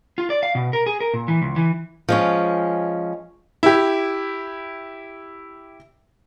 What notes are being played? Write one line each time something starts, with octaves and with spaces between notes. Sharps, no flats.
F4
D5
F5
B2
A#4
G#4
A#4
A#2
E3
C#2
E3
F3 G#3 C#4
E4 G4